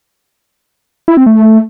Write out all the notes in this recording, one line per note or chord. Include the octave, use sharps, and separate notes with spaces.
E4
C4
A3